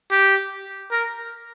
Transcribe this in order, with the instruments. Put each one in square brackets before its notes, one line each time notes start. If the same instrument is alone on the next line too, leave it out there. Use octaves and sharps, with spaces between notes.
[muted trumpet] G4
A#4